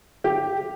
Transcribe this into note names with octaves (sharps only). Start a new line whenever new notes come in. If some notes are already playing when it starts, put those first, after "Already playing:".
G4